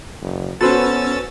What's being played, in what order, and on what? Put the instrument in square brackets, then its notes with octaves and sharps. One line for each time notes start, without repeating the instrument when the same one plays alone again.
[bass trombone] F#1
[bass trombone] B3 [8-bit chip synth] C#4 E6 A6 [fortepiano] F#4 [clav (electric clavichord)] A4 B4 C5